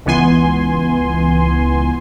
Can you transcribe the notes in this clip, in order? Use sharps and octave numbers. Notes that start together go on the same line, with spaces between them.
C#2 E3 B3 G#5 C6